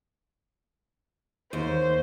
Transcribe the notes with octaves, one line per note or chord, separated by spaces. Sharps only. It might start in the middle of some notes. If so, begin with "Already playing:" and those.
D#2 C5